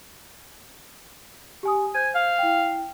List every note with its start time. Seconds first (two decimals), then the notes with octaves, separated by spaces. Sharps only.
1.63 G4 G#5 D#6
1.95 C5 G#5 G6
2.15 F5
2.38 E4 G5